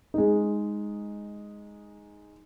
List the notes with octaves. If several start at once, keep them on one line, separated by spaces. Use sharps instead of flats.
G#3 D#4